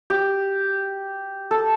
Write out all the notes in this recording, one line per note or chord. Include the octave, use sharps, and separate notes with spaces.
G4
A4